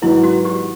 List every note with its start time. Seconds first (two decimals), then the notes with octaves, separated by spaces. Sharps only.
0.02 G#2 D#3 F#3 B3 E4
0.24 F#4
0.45 G4